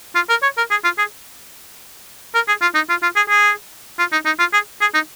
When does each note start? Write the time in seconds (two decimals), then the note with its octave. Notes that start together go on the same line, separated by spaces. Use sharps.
0.15 F4
0.30 A#4
0.43 C#5
0.57 A#4
0.71 G#4
0.84 F4
0.98 G#4
2.35 A#4
2.48 G#4
2.62 F4
2.75 D#4
2.89 F4
3.03 F4
3.16 G#4
3.30 G#4
3.99 F4
4.12 D#4
4.26 D#4
4.39 F4
4.53 G#4
4.81 G#4
4.94 D#4